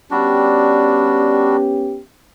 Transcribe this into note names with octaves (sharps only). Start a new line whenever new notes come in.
G3 B3 C#4 D4 F#4 G4